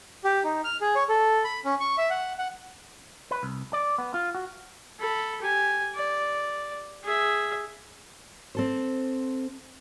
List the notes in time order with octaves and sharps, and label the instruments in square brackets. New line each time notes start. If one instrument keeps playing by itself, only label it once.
[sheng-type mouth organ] G4
D#4
F6
G#4
C#5
A4
B5
C#4
C#6
E5
F#5
F#5
[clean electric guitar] B4
C2
D5
B3
F4
F#4
[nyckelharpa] A4 B5
G4 G#5
D5
G#4 E5
[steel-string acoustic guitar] C4 A4 C5